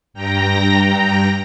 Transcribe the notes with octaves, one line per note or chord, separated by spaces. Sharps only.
G2 G5 A#5 A#6